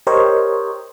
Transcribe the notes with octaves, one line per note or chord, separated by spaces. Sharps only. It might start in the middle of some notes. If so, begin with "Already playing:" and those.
G4 A#4 C5 C#5 D#5